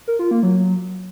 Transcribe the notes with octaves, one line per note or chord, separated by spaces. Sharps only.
A#4
F4
A#3
F#3